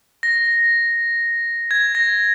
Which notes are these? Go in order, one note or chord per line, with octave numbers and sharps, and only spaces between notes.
A#6
G#6
A#6